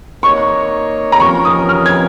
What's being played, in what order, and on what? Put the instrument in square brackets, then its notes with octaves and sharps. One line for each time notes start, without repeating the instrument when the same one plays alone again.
[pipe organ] A#3 D#4 C#5 [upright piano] C#6
[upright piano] A#5
[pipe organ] F3 C#4 A#4 [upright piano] C#6
[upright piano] D#6
F6
G#6